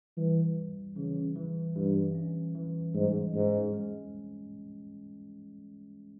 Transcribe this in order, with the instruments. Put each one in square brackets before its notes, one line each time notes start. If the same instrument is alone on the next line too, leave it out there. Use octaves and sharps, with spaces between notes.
[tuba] E3 [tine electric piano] G3
[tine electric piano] E3
[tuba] C#3 [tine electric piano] E3
[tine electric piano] E3
[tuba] G2 [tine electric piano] E3
[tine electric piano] C#4
E3
[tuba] G#2 [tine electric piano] G3
[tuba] G#2 [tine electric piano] C#4
[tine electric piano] G#3